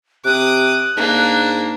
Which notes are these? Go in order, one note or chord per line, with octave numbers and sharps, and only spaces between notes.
C3 D6 D#6 F#6
G#2 A#3 D4